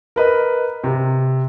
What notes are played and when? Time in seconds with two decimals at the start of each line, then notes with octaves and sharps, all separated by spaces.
0.16 A#4 B4 D#5
0.84 C3